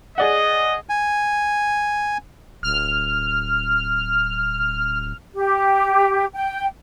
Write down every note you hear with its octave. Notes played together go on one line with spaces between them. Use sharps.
G#4 D5 D#5 F#5
G#5
D1 F6
G4
G5